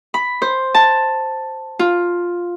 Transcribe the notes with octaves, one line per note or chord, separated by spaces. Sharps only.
B5
C5
A5
F4